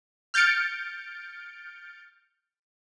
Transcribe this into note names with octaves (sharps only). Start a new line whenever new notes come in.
F6 G6 A6 C#7 D7